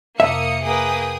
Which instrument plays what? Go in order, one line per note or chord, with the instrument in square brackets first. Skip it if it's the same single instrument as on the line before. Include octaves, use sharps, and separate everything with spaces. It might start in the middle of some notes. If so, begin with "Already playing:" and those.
[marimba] F2 C3 [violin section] A#3 D#6 C#7 [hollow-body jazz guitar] E5
[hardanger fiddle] A#3 B4 [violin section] G#4 G5 D#6